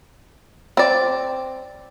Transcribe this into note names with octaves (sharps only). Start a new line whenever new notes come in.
C4 D5